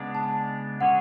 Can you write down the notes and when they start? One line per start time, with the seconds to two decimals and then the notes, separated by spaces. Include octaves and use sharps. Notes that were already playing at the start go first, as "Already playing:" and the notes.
Already playing: C#3 G#3 B3 D4
0.15 A5
0.81 D3 G#3 C#4 G#4 C#5 F#5